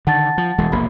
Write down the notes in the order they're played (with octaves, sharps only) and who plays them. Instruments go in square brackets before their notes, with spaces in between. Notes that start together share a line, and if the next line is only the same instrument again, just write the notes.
[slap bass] D3 D#3 [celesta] F#5 A5 A6
[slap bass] F3
E1 E3 G#3
[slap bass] E1 A#1 A#3 [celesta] B5